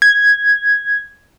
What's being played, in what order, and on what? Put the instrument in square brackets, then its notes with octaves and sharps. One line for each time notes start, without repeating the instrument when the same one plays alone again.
[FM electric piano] G#6